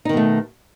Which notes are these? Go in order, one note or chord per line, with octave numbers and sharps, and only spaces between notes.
B2 D#3 A3 D#4